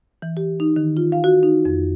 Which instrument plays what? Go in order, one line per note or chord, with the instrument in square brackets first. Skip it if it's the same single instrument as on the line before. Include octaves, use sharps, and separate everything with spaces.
[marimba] E3
G4
D#4
D#3
F4
F5
F#4
D#4
F2